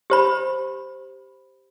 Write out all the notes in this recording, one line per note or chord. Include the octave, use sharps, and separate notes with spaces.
G4 C5 B5